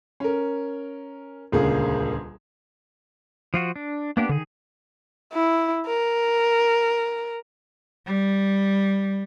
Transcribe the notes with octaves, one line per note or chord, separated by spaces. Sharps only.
C#4 A#4
D#1 C#2 D3 A#3 G#4
F3 F4 F#4
D4
A#3 B3 D4 G4
D3 D#3 G#4
E4
A#4
G3